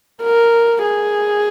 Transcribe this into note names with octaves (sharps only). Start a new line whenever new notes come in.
A#4
G#4